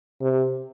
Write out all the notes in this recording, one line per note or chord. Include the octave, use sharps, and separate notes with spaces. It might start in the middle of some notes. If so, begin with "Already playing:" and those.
C3